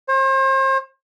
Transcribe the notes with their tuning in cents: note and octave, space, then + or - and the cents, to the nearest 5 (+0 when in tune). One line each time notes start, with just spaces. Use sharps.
C5 +40